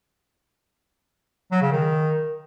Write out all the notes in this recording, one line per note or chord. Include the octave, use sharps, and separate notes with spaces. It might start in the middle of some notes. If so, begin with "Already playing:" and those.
F#3
C#3
D#3